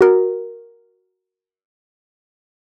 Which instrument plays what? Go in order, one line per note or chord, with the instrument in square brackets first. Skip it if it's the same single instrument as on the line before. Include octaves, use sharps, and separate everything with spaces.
[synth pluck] F#4 A#4